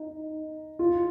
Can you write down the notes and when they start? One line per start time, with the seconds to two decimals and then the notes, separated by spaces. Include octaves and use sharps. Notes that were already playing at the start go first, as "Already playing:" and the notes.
Already playing: D#4
0.79 F4